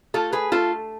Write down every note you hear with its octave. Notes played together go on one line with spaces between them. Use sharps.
A3 F4 A4
G#4 B4
A3 F4 A4